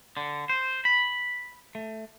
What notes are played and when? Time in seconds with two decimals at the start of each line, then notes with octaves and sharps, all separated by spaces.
0.17 D3
0.49 C5
0.85 B5
1.75 A3